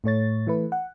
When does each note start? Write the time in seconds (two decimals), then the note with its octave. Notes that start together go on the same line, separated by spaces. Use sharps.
0.04 A2 A3 C#5 A6
0.47 E3 A3 B4
0.72 F#5